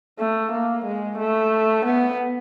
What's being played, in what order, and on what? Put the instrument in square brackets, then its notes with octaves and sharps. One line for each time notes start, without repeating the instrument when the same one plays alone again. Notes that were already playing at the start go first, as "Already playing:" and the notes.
[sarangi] A3
A#3
G#3
A3
B3